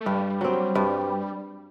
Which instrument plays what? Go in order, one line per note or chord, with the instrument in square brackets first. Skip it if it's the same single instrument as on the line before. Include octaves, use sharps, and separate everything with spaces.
[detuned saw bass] A3
[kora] G2 [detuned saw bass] G3
[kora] F#3 C4
G2